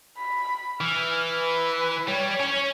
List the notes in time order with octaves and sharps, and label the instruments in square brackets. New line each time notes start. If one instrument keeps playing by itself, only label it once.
[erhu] B5
[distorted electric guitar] E3 [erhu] F6
[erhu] B4
[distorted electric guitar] G3 [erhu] C#5
[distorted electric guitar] C#4